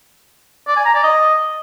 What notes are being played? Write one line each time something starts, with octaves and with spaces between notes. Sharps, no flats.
D5
G#5
A#5
D5
D#5